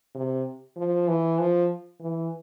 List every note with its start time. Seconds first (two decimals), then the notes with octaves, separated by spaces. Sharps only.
0.14 C3
0.77 F3
1.08 E3
1.39 F3
2.00 E3